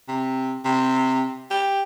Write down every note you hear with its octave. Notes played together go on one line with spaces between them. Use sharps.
C3
C3
G4